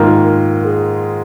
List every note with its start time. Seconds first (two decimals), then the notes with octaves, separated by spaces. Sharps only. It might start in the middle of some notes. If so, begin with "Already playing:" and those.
Already playing: G#2 D#3 A#3 F4
0.23 A#4
0.64 G#4